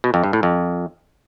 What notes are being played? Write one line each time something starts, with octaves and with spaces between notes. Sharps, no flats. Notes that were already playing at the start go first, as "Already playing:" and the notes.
B2
F2
G2
A2
F2